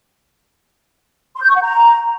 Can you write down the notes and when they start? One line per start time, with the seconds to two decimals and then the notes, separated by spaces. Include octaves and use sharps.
1.36 C6
1.43 G6
1.49 C#6
1.56 F#5
1.63 A#5